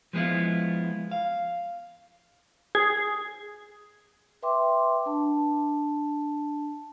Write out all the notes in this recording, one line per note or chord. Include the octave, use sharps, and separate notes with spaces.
F3 G#3 B3 E4 F4
F5
G#4
B4 E5 G5 C6 D6
D4 A5